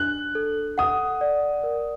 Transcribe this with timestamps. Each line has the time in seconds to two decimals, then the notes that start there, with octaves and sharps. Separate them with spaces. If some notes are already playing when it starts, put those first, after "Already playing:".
Already playing: D4 F#6
0.35 A4
0.78 F#5 D#6
1.21 D5
1.64 A#4